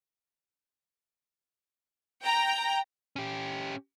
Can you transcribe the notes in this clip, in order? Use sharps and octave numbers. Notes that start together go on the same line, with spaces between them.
G5 A#5
C#4 G4